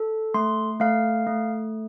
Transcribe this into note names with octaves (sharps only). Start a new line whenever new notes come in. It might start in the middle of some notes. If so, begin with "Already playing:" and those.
Already playing: A4
A3 C6
A3 F5
A3